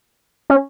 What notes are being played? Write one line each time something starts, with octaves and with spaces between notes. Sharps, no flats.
C#4